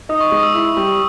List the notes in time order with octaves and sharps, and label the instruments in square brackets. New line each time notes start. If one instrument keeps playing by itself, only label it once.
[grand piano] D#4 [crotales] D#6
[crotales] C#6
[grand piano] G#3 [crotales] D#6
[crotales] E6
[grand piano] E4
G3